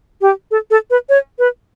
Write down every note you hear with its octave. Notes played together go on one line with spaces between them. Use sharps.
G4
A4
A4
B4
C#5
B4